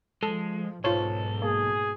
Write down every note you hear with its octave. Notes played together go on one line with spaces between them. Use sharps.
F3 G#3 A4
B1 G#2 B2 F4 A4 C5 C#5
A#3 G#4